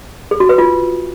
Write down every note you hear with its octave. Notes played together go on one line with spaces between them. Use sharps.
G#4
F#4
B4
F4